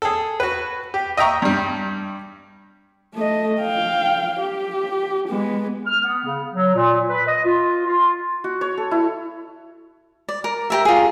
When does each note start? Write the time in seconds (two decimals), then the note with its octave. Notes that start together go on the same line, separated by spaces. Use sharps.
0.02 G#4 A4
0.40 F#4 B4
0.94 G4
1.17 D#5 E5 G5 A#5 C#6
1.42 G2 G3
3.14 A3 D#5
3.62 F5 G5
4.41 G4
5.28 G#3 B3
5.87 F6
6.04 B3
6.25 C#3
6.54 F#3
6.75 A#2
7.09 B4
7.28 D#5
7.46 F4
7.87 F4
8.44 F#4
8.61 C#5
8.77 A4
8.91 E4
10.29 D5
10.44 A#4
10.70 G4 A#4 E5
10.85 F4 G#4